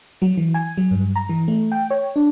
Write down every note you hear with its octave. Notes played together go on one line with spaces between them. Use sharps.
F#3
E3
G#5
F#3
G2
A#5
E3
A3
G5
C#5
D4